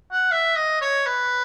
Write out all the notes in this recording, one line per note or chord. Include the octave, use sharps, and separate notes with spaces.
F#5
E5
D#5
C#5
B4